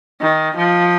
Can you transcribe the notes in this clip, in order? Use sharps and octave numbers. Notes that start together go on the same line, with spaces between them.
D#3
F3